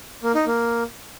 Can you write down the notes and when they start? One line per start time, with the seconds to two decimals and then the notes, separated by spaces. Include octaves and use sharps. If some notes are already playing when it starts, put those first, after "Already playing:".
0.23 A#3
0.35 D#4
0.46 A#3